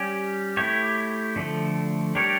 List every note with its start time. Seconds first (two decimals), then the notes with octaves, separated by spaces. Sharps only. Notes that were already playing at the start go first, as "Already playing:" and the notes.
Already playing: G3 C#4 G4
0.57 A3 E4 G4 C#5
1.36 D3 F3 A3
2.15 G3 D4 G4 A#4 C#5